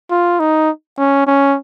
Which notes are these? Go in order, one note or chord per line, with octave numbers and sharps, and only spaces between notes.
F4
D#4
C#4
C#4